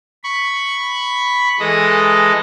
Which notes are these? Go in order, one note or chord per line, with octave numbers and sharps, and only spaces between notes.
B5 C#6
E3 G#3 A4 D#5